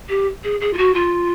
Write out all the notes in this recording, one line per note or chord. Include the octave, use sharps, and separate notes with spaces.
G4
G#4
G#4
F4
F#4
F4